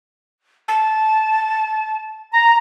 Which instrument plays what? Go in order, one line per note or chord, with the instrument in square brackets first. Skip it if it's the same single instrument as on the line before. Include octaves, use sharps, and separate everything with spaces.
[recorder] A5
[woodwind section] A#5